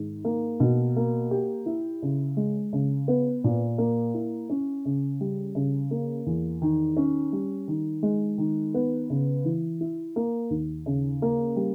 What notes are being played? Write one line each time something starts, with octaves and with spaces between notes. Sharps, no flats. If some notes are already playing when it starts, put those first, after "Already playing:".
Already playing: G#2 D#3
A#3
B2
A#3
G4
E4
C#3
G#3
C#3
B3
A#2
A#3
E4
C#4
C#3
G3
C#3
A#3
E2
D#3
C#4
G3
D#3
G#3
D#3
B3
C#3
E3
E4
A#3
D#2
C#3
A#3
G3